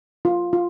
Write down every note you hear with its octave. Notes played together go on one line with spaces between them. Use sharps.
F4
F4